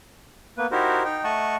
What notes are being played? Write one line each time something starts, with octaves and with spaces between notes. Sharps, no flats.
A#3 B3 B4
D#4 E4 F#4 G4 A#4 C5
D#4 G5
A3 D#5 F#5 A5 C#6